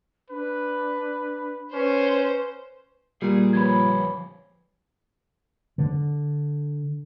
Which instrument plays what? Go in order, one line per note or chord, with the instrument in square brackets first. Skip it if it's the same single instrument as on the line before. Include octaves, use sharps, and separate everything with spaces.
[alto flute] D4 [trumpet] B4
[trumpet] C#4 [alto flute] B4 [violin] C5
[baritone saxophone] A#2 [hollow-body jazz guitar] G3 [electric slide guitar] G#4
[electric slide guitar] F3 B4 C#5 [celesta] B5 G#6
[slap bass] D3